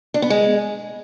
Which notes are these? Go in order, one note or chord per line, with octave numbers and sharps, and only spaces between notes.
D4
B3
G#3